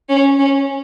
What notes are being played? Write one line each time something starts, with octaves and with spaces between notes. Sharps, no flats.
C#4
C#4